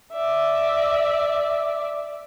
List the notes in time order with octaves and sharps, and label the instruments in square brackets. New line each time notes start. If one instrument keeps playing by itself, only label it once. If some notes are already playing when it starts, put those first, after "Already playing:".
[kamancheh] D5 E5